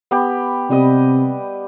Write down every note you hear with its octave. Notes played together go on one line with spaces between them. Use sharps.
B3 G4 B5
C3 G3 B4 D#5